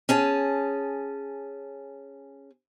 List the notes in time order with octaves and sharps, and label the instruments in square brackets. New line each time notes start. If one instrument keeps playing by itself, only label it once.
[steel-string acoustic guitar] C#4 G#4 A5